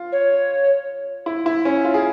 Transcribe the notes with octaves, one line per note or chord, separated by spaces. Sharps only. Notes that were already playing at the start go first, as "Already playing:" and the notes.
Already playing: F4
C#5
E4
E4
C#4
F4
G#4